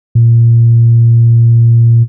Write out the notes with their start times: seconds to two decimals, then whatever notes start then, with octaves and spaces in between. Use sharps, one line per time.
0.15 A#2